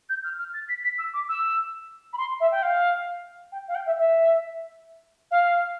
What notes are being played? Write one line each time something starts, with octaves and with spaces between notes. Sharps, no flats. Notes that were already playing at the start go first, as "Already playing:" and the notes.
G6
F6
F6
A6
B6
B6
E6
D6
E6
B5
C6
E5
G5
F5
G5
F5
G5
E5
E5
F5